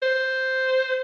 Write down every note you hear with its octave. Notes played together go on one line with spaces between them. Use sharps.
C5